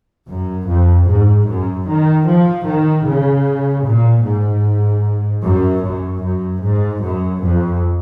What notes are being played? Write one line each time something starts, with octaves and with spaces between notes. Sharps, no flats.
F#2
F2
G#2
F#2
D#3
F3
D#3
C#3
A#2
G#2
F#2
F#2
F#2
G#2
F#2
F2